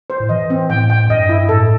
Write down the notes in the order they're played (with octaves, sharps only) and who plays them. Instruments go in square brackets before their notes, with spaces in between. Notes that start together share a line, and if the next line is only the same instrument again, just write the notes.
[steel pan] C5
[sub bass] A2
[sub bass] E3 [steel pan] D#5
[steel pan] C4
[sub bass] A2 [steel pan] G5
[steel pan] G5
[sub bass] G2 [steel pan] D#5
[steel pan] E4
[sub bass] A2 [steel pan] A4